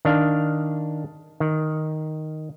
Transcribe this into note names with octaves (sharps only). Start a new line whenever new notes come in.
D#3 D4 F5
D#3